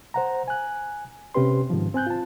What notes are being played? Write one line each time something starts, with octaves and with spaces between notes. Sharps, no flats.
C5 F#5 A#5
G#5 F#6
C3 C#4 G4 B4 C6
G#2 D#3 F3
C4 G#5 F#6 G6
F4 A5